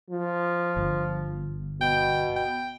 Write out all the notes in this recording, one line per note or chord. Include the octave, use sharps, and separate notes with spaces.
F3
G1
B2 G5
G5